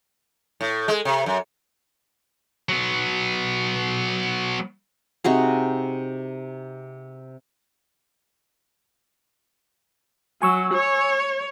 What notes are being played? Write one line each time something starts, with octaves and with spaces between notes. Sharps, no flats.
A2
G#3
C3
F#2
F#3 B3
C3 D#4 F#4 G#4
F#3 G#5 C#6 E6
C#5